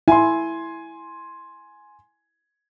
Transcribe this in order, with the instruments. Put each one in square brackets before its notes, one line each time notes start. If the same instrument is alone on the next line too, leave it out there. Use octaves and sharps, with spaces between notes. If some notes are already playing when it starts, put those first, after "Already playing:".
[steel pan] E4 [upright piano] G#5 C6